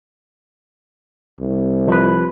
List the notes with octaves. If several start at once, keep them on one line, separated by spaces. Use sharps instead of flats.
C2
F3 B4